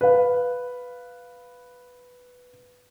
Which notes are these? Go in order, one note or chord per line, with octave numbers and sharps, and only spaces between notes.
B4 F5